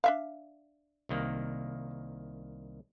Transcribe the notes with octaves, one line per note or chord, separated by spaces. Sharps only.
D4 E5 F5
C2 D#3 A#3